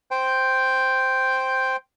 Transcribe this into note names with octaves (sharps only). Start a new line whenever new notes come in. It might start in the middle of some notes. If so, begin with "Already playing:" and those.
C5 G5